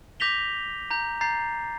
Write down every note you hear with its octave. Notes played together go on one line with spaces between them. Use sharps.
D6 G6 A#6 B6 F7 G7
A#5 G6
A#5 G6 A6 C7